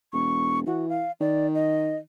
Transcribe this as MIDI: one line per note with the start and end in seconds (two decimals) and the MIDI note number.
0.13 0.63 28
0.13 0.60 85
0.66 1.04 52
0.66 0.86 66
0.89 1.12 77
1.21 1.98 51
1.21 1.47 74
1.55 1.97 75